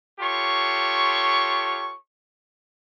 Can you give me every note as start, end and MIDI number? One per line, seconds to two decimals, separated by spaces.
0.20 1.94 65
0.20 1.94 67
0.20 1.94 69
0.20 1.94 73
0.20 1.94 84
0.20 1.94 85